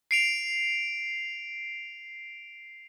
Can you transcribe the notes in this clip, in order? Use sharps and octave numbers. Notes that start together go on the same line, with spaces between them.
C7 D7 F7